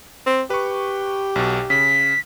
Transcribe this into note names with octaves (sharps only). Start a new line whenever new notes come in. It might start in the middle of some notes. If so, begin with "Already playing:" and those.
C4
G4 B4 C#6
B1 B2
C#3 B6